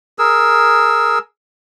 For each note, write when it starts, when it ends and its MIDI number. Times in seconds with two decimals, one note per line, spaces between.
0.19 1.19 68
0.19 1.19 70
0.19 1.19 88